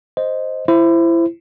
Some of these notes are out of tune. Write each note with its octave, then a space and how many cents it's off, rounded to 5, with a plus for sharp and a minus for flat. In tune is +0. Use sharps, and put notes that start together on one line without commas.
C5 +0 D#5 +0
E4 +25 C5 +0